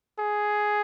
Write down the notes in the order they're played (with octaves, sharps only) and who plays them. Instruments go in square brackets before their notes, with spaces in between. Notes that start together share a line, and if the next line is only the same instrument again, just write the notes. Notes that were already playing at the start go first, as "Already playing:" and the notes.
[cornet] G#4